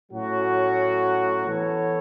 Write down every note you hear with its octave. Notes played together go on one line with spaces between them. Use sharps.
A2 F#3 C#4 F#4
E3 B3 A4 C#5